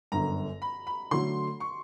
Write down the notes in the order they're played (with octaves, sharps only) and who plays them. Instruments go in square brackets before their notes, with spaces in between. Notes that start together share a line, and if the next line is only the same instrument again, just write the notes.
[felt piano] G1 F#2 D3 [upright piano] A#5
[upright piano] B5
B5
[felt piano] D3 F#3 A3 [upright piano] C6
[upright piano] C#6